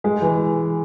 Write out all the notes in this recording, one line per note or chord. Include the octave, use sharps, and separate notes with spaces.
G#3
E3